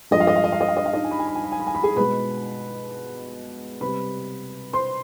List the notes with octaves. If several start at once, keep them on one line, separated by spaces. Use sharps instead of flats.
G2 F3 G#3 D#5
F5
D#5
F5
D#5
F5
D#5
F5
D#5
F5
D#4 D#5
G#5
B5
G#5
B5
G#5
B5
G#5
B5
G#5
B5
G#4 G#5
B2 G#3 B4 B5
C3 G3 B4 B5
C5 C6